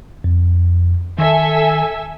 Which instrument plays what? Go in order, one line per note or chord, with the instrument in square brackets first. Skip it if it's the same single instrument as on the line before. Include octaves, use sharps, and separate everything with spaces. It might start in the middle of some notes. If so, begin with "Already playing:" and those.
[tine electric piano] F2
[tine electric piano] D#3 [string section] A4 E5 G#5